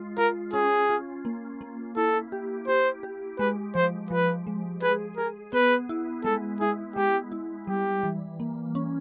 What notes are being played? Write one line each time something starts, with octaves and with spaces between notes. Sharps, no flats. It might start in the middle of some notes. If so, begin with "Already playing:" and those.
Already playing: G#3 F4
F4 A#4
C#4 G#4
F4
A#3
A#3
E4 A4
G4
G4 C5
G4
G#3 B4
F3 C5
F3 B4
G#3
G#4 B4
G#4 A#4
B3 B4
E4
G#3 A4
E4 G#4
G#3 G4
E4
G3 G4
E3
A#3
C#4